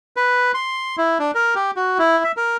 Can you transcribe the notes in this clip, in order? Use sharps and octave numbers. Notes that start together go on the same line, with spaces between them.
B4
C6
E4
D4
A#4
G4
F#4
E4
E5
A#4